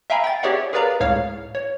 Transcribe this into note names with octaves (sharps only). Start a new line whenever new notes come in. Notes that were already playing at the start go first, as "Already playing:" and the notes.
E5 F5 G5 G#5 A#5 B5
G5 A6
G4 G#4 C#5 D5 E5 F#5
G#4 A#4 B4 D5 F5 A#5
C#2 A2 C#5 F5 F6
C#5